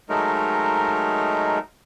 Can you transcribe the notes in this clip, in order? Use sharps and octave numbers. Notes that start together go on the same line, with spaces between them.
F#3 G#3 A3 D#4 A#4